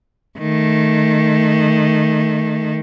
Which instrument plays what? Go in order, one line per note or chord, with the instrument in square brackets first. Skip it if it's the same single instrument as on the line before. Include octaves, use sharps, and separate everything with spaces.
[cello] D#3 A3